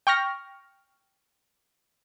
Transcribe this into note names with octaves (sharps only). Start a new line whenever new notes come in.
G5 C#6 F6 A#6